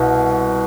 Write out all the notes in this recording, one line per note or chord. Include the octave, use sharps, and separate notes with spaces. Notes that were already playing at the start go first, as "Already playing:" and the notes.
Already playing: C2 B2